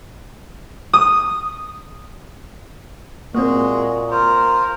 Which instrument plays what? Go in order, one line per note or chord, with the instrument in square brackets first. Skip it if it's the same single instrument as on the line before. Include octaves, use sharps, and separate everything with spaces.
[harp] D#6
[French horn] A#2 [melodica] G#3 F#4 G#4 [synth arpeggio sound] A#3 C4
[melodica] F4 C5 [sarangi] A#4